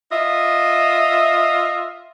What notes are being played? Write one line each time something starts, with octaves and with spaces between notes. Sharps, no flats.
F4 D#5 E5